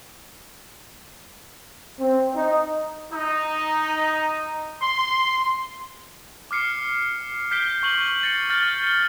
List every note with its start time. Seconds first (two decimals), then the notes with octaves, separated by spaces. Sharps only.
1.99 C4
2.34 D#4
3.12 D#4
4.82 C6
6.51 D6 F6 C7 C#7
7.51 F6 G6 B6 C7 D7 G7
7.83 C#6 F#7
8.23 A6 A#6 C#7
8.50 F6 G6 A6
8.84 C#7 G7